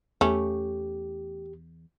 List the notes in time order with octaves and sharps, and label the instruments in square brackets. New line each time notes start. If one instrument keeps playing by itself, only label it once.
[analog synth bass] E2 [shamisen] A3 C#4 [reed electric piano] G4